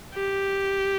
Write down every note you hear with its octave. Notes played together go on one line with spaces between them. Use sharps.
G4